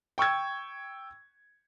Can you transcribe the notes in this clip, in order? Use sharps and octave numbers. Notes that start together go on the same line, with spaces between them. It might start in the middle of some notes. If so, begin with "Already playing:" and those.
G5 C#6 E6 G#6